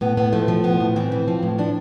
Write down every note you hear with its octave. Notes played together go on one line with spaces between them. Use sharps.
A2 B3
A2 B3
F3 A3
F3
A2 B3
A2
E3 C4
E3
F3
A2
F3 D4